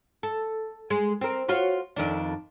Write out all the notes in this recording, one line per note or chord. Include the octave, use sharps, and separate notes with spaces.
A4
G#3
C4 A#4
F4 F#4 C#5
F2 D#3 D4